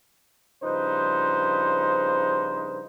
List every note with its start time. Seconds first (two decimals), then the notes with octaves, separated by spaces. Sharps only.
0.63 G2 C#3 F3 D#4 B4 C5